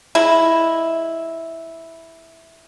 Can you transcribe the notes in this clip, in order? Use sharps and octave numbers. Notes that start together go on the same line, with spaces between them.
G#3 E4